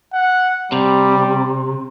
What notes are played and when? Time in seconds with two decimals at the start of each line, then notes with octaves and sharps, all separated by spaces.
0.13 F#5
0.72 C3 G3